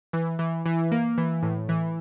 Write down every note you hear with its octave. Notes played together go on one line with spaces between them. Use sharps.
E3
E3
E3
A#3
E3
A2
E3